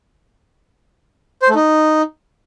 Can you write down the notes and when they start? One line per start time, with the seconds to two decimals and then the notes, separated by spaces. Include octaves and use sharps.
1.42 C5
1.49 A3
1.55 D#4